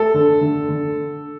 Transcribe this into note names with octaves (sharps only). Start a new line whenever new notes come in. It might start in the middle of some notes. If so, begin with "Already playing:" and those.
Already playing: A3 A4
D3
D3
D3